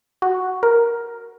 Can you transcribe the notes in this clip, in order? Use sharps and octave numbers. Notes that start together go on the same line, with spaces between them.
F#4
A#4